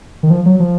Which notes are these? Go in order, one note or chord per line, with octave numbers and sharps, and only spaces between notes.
D#3
F3
F#3
F3